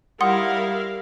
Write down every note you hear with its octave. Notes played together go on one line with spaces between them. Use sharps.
G3 E4 A#4 F5 F#5 C6 D#6